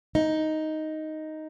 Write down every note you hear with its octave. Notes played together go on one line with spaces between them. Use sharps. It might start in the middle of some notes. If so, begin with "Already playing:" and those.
D#4